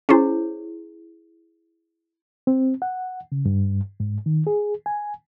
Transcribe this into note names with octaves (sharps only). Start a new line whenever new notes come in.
C#4 E4 G#4 C5
C4
F#5
C#3
G2
G#2
D#3
G#4
G#5